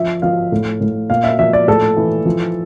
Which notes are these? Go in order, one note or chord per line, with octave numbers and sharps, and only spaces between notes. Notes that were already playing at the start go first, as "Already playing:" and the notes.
Already playing: F3 E5
F3 F5
A2
A2
A#2 F5
E5
F3 E5
D5
A2 A4
E3
F3